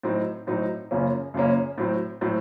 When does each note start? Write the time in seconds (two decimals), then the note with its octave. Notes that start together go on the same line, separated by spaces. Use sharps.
0.03 A2 F#3 C4 D#4
0.47 A2 F#3 C4 D#4
0.91 F#2 C#3 F3 A#3 C#4
1.34 F#2 C#3 F3 A#3 C#4
1.78 A2 F#3 C4
2.21 A2 F#3 C4